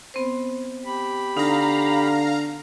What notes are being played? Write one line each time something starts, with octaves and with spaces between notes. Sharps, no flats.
B3 C4 C5
G4 B5
D3 D#4 F5 A#5